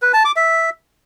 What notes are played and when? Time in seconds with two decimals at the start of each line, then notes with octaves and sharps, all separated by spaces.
0.02 B4
0.13 A5
0.25 D6
0.36 E5